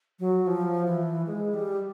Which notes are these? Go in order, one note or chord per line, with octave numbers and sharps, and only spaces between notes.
F#3
F3
E3
G#3
G3